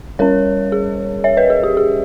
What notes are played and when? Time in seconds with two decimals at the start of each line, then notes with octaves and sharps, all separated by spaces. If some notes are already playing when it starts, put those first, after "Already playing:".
0.19 G3 C#4 A#4 C#5
0.72 G#4
1.24 C#5 E5
1.37 B4 D#5
1.50 G#4
1.63 G4
1.77 G#4